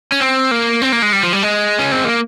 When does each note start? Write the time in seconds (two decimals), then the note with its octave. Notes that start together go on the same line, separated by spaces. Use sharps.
0.12 C#4
0.21 C4
0.51 A#3
0.82 C4
0.92 A#3
1.02 G#3
1.13 G3
1.23 F3
1.33 G3
1.43 G#3
1.79 C#4
1.92 C4
2.04 A#3